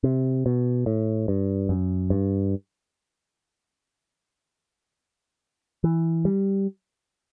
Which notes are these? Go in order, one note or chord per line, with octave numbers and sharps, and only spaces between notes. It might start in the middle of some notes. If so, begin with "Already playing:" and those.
C3
B2
A2
G2
F#2
G2
E3
G3